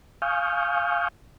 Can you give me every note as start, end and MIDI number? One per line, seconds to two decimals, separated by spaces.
0.22 1.08 77
0.22 1.08 80
0.22 1.08 85
0.22 1.08 87
0.22 1.08 89
0.22 1.08 91